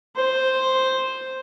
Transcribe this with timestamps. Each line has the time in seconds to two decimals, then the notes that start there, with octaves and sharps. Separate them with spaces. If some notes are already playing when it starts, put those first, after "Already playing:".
0.16 C5